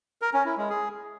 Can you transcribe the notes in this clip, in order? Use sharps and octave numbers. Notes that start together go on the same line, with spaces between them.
A#4
C#4
E4
G#3
G#4